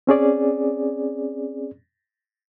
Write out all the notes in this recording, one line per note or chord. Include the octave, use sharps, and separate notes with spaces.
C4 C#4 G#4 D5